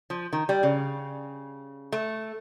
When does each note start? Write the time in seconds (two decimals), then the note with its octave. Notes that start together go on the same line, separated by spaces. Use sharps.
0.10 F3
0.33 D#3
0.49 G3
0.63 C#3
1.92 A3